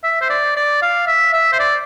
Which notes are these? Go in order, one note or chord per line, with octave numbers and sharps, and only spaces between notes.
E5
C5
D5
D5
F5
E5
E5
C5
D5